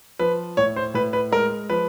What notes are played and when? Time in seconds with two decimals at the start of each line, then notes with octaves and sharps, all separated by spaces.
0.19 F3 B4
0.57 A2 C#5
0.76 C5
0.94 A2 B4
1.13 B4
1.32 G#3 A#4
1.70 F3 B4